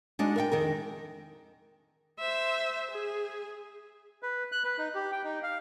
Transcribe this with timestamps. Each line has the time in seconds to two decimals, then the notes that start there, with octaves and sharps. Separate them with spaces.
0.19 G#3 D4 D#4 F#4
0.36 A#4 E5 G5
0.52 F2 D#3 G#4 A#4
2.19 C5 E5
2.91 G#4
4.23 B4
4.52 F#6
4.64 B4
4.78 D#4
4.95 G4
5.12 G5
5.24 D#4
5.43 F5